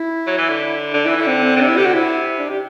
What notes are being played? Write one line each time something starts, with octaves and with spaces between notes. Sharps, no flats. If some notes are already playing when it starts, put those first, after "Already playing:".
Already playing: E4
F#3
E3
D3
D3 D4
E3 E4
D3 E4
C4
C4
D3
C3 D4
E4
D3 G4
F#4
C3 E4
D4
G4